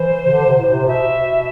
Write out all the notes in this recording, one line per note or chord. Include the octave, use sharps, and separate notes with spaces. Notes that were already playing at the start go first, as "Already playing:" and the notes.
Already playing: E3 C5
C3
D3
C3
A2
C3
B2 E5